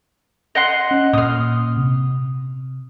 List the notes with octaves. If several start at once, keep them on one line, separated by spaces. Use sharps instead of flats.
D#5 F#5 C6
C#4
A#2 D#6 F6
C3